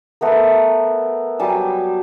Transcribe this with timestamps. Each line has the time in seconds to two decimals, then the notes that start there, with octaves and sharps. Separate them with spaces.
0.21 A3 B3 A#4
1.39 F#3 G3 G#5 A5